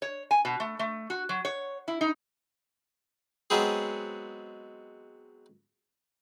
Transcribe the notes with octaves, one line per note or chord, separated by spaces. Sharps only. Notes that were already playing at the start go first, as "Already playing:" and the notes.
C#5
G#5
B2
A3
A3
F#4
F#3
C#5
E4
D#4
F#3 G#3 B3 C4 G#4